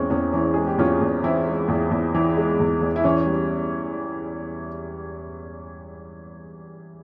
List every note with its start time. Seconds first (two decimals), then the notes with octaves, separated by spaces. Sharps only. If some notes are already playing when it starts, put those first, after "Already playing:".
Already playing: E2 E3 G#3 C4 C#4
0.10 E2 C#4
0.33 E3 C#4
0.54 G#3 G#4
0.67 G4
0.78 E2 C#4 F4
1.01 E2
1.23 E3 C4 E4
1.46 G#3
1.68 E2
1.91 E2
2.15 E3
2.37 G#3
2.60 E2
2.82 E2
2.96 E4
3.04 E3 C#4
3.26 G3